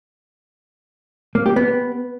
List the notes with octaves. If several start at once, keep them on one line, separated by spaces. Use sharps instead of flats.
A#3
G4
B3